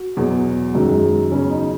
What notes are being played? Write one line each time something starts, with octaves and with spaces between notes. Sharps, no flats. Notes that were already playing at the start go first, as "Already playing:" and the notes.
Already playing: F#4
E2 B2 F#3
F#2 D#3 F#3 G#3
G#3
G#3
E2 C#3 F#3 C#4
D#4